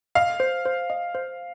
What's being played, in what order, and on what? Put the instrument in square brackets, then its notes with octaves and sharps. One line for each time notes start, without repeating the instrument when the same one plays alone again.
[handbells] D#5 [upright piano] F5
[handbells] C5
C5
D#5
C5